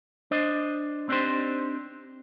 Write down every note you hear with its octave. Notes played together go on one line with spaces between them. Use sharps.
D4 C5 D#5
C4 D4 D#4 G4 C5